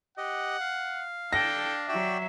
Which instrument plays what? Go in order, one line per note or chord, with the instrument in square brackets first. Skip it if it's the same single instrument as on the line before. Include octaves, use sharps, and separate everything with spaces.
[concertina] G4 D#5 [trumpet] F#5
[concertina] F5
[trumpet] D4 [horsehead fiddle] A4 G5 [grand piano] A#6
[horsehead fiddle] F#3 E5 [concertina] F#4 D5 G5